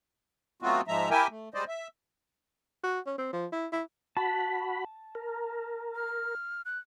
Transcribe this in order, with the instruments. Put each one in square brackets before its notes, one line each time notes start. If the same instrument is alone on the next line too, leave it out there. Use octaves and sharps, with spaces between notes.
[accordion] F#3 A3 B3 C4 F4 F#4
G#2 F3 G#3 E5 A#5
E4 G4 A#4 E5 G5 G#5
A3
G3 G#3 C5 D5 D#5
E5
[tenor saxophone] F#4
C#4
C4
F3
E4
E4
[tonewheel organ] F#4 B5 [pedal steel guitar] A5
[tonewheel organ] A#4
[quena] F6
F#6